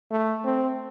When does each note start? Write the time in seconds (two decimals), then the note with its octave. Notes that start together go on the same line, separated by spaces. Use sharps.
0.11 A3
0.45 C4